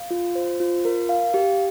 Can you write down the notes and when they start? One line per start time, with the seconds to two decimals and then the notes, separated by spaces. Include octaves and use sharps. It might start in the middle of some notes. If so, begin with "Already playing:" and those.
Already playing: F5
0.11 F4
0.35 C5
0.60 F4
0.85 A#4
1.09 F5
1.34 G4